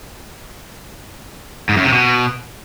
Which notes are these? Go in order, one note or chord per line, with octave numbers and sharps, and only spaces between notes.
G#2
F#2
C3
B2